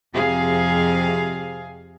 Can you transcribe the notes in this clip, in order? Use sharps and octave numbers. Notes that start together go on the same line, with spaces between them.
F2 C3 G#4 F5